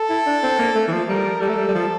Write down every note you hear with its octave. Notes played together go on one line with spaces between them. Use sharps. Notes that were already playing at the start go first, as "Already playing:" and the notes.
Already playing: A4
E4
D4
C4
A#3
A3
E3
F3
G3 A#4
G3 A4
A3
G3
G3
F3